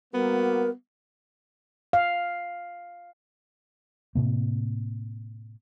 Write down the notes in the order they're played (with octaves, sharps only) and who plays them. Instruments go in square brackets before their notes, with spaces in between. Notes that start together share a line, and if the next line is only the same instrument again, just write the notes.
[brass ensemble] G3 A#3 F#4 [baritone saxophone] B3 [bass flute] A#4
[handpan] F5
[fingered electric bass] A2 C3 A#3